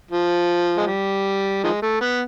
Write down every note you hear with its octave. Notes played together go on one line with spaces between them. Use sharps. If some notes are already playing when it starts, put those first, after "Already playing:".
F3
G#3
G3
D#3 F3 G#3
A3
B3